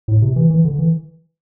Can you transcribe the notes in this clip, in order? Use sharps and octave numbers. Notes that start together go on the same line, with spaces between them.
A2
C3
E3
E3
D3
E3